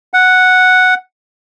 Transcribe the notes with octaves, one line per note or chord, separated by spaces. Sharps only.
F#5